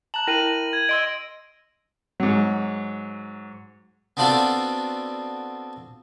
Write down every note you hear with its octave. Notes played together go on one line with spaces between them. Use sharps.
A5 A#5 F#6 F#7
E4 A#4 G5 A#6 D#7 F#7
G#6
D#5 C6 E6 D7
G#2 F#3
B3 C4 D4 F4 F#4 A4